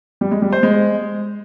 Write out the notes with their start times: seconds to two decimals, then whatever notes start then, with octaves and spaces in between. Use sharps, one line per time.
0.21 G3
0.32 G#3
0.42 G3
0.53 C5
0.63 G#3